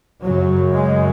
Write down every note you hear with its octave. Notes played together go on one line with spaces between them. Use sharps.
F#2 C#3 F#3
G#3